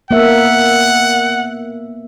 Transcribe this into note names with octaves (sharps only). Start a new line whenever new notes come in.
A#3 B3 E5 F#5